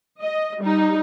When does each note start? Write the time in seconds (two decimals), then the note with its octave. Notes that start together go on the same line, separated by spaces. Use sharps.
0.20 D#5
0.60 G3 D#4